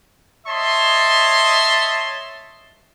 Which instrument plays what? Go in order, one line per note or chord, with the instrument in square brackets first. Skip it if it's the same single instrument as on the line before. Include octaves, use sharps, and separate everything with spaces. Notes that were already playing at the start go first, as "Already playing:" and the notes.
[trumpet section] C#5 D#5 E5 A5 C6